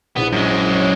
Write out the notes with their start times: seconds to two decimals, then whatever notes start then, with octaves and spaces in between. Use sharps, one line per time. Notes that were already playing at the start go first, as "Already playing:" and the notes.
0.16 A#1 B3 E4
0.33 F#2 G#3
0.75 C#5